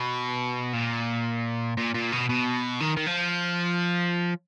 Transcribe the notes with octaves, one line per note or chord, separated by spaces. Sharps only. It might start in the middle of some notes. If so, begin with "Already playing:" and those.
Already playing: B2
A#2
A#2
A#2
B2
B2
D#3
D#3
F3